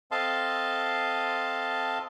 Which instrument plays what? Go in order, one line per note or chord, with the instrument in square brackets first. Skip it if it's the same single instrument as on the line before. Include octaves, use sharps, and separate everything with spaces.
[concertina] C4 A4 D#5 F5 A5 C6